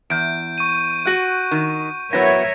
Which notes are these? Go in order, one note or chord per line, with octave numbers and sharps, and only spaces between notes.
E2 G6 D7
C#6 D#7
F#4 F#5
D#3
F#3 B3 E4 A#4 C#5 E5 A#6